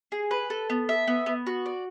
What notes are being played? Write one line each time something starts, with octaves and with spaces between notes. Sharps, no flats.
G#4
B4
A4
B3
E5
B3
B3
F#4
D5